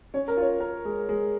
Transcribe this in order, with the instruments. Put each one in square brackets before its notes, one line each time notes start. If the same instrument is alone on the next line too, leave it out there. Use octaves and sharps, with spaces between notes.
[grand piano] C#4 [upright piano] C#5
[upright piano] A#4
[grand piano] F4 [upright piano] C#5
[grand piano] A#4
G#3
G#3